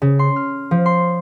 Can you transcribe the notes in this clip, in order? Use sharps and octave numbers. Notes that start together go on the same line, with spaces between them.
C#3
C6
F6
F3
C6